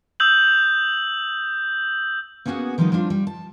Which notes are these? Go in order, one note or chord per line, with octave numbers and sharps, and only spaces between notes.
D#6 E6 G6 F#7
A#3 B3 C#4 F#4 G#4 F#5
D#3 F3 G3 B3 D#4
F3 G3 C4 D4 F4
G3
A5